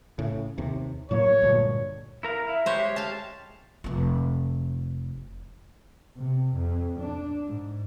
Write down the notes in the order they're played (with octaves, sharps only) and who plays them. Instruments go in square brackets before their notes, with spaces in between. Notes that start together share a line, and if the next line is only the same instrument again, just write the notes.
[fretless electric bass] A2 C#3
D#2 C3
[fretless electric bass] A2 F#3 A#3 [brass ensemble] C#5
[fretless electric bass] D2 G2 A#2
[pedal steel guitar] E4 A#4 F5
[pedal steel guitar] E4 F5 [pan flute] E5
[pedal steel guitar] G#3 G4 [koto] C5 C#5
[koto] F5 A5
[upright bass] F1 F2
[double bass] C3
F2
D4
G#2